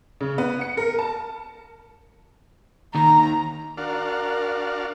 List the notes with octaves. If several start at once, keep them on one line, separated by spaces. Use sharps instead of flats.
C#3
B3
C#7
A#4
A5
D#2 D#3 A#5
D4 F#4 A#4 F5